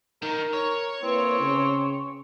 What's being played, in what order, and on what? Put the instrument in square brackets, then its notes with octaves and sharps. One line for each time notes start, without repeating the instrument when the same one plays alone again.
[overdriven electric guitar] D#3 [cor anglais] A#4
[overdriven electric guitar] C#5
[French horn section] A#3 E4 B4 [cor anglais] C4
[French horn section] C#3